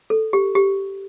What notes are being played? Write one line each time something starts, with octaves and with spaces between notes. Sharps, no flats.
A4
G4
G4